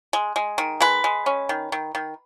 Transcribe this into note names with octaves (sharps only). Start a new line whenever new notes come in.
G#3
G#3
D#3
G#3 B4
G#3
C#4
D#3
D#3
D#3